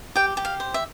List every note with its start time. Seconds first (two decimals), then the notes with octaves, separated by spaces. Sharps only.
0.16 G4 G5
0.37 G4
0.45 F5
0.60 C5
0.74 E5